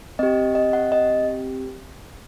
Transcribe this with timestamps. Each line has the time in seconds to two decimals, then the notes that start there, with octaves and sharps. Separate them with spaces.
0.19 C4 G4 D#5
0.55 D#5
0.73 F#5
0.92 D#5